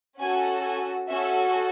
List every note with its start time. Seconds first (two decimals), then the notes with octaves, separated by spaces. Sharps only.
0.19 C#4 F#4 A4 G#5
0.63 G#5
1.07 C#4 F#4 A4 E5